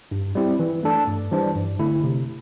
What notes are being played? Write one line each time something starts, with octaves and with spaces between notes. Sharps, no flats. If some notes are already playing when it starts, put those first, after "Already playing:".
G2
G3 C4 E4
E3
A3 D4 A4
G2
E3 G3 D4 C5
G2
D3 A3 E4
C3